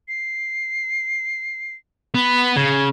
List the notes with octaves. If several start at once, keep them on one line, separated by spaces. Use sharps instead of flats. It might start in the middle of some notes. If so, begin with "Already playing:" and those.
C7
B3 B5
C#3 G#6